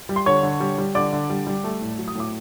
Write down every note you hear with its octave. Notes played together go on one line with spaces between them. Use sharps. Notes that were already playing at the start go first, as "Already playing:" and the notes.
G3
C6
D3 C#5 C#6
D3
G3
G3
D3 D5 D6
D3
G3
G3
A3
A2
F#3
D#6
A2 D6